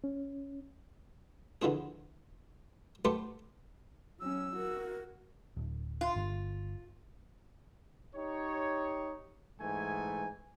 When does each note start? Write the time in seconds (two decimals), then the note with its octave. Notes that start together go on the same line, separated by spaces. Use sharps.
0.04 C#4
1.62 D3 E3 F3 C4 G#4
3.05 A3 G4 B4 C5 F#5 A5
4.20 F#3 C#4 E6
4.55 F#4 A#4
5.57 D1
6.01 F4
6.16 G1
8.15 D#4 G4 C#5
9.60 G#2 E3 A3 G#5